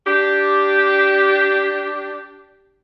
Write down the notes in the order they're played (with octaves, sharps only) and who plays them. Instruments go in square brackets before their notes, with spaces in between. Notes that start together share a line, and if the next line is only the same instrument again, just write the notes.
[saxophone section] D4 G4